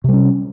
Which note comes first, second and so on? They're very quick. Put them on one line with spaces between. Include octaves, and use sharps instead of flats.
C3 G3 C#4